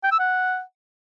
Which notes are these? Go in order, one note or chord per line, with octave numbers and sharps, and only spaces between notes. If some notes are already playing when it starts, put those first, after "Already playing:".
G5
E6
F#5